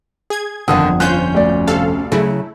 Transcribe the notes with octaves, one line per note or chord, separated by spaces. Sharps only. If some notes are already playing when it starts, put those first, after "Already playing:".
G#4 G#6
G1 F2 D3 D#3 F3 F#5 D#6
C#4 F4 C5 F#6 G6
D2 D5
C3 A4 F5
C#3 F#3 A3 E4